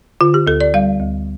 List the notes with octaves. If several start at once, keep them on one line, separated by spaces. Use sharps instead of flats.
D3 F4
G4
D2 A4
D5
G3 F5
D2